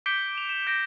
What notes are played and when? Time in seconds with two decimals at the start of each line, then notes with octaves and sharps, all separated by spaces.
0.06 D6 G6 B6 C#7 D7 G7
0.35 E7 F7
0.49 E7
0.67 G6 A#6 D7